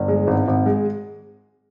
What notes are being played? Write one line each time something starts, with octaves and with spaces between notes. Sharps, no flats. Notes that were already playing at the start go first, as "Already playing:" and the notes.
Already playing: G1
G#3
G#1
G#1
G#3